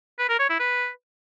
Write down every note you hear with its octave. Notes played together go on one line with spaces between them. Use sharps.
B4
A#4
C#5
E4
B4